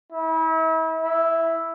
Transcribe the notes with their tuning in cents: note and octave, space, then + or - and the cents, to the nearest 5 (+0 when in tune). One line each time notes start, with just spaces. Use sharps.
E4 -35
E4 +0